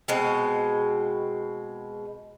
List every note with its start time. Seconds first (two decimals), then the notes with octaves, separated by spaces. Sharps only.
0.08 B2 G#3 C4